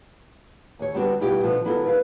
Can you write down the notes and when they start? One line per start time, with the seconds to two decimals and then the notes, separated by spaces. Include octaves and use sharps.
0.79 D#2 C#5
0.94 D3 G3 B3 C4 D4 F#4
1.20 G2 B2 E4 F4 G4
1.43 B2 D3 F3 B3
1.64 D3 F#3 B3 E4 F4 A4
1.84 A#4 B4 F5